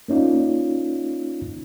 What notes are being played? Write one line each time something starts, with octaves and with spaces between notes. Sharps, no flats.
A#3 C#4 D#4 F4